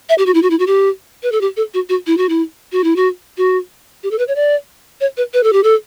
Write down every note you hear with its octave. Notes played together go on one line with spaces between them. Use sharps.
E5
G4
F#4
E4
F#4
E4
F#4
G4
B4
A4
G4
A4
F#4
F#4
E4
F#4
E4
F#4
E4
F#4
F#4
G4
A4
B4
C#5
D5
C#5
B4
B4
A4
G4
A4